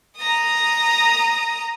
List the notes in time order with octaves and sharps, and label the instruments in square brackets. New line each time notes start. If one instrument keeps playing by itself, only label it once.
[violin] A#5 D#6